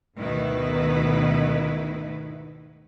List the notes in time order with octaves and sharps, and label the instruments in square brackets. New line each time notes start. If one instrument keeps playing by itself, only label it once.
[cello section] D2 G#2 B2 D#3 E4 B4